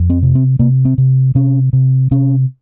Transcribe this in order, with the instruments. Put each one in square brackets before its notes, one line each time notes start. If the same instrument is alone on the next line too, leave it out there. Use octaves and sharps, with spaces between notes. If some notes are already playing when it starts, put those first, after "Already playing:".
Already playing: [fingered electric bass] F2
C4
C3
C4
C3 A#3
C4
C3
C3 C#4
C3
C3 C#4